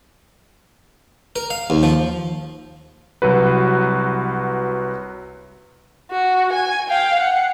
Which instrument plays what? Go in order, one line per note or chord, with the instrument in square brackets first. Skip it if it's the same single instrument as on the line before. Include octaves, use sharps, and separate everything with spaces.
[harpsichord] A#4
F5
D#2
F3
[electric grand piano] C2 F#3 F#4 B4
[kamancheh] F#4
G#5
F5 G5
F#5